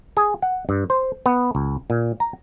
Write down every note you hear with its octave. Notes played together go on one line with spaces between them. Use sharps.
G#4
F#5
G2
C5
B3
C#2
A#2
A#5